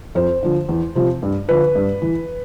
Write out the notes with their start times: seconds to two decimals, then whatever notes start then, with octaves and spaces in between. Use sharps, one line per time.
0.15 F2 C5
0.43 D3 F3
0.69 E2
0.95 C3 F3
1.23 G2
1.49 D3 F3 B4
1.75 G2
2.02 E3